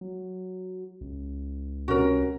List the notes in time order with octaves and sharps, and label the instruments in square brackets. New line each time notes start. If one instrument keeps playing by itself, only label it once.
[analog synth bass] F#3
C#2
[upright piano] C3 C#4 [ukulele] F#4 A#4